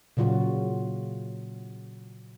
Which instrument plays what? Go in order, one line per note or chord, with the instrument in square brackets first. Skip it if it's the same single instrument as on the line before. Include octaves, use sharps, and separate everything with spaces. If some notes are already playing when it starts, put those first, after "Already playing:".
[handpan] A#2 C#3 F#3 F4 F#4